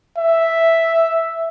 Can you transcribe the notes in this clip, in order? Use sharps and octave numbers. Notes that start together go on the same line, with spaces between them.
E5